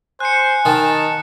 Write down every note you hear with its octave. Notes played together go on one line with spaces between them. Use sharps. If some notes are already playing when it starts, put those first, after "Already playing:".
C5 G#5 F#6 C#7
D#3 A5